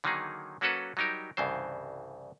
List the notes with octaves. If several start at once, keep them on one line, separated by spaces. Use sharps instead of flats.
D3 D#3 F#3 A#3 D#4 G#4
F#3 A#3 C#4 F#4 A4 B4
F#3 G3 D#4 G4 A#4
C2 G2 C#3 E3 C5